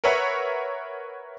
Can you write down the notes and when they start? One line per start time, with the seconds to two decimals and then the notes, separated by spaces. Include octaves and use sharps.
0.04 A#4 B4 C#5 E5 F#5